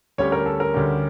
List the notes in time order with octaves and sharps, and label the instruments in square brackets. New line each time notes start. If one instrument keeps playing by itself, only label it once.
[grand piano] D2 D3 G3 C#4 G4 [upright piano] C#5
[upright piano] A#4
A4
A#4
[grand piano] D2 D3 G3 C#4 G4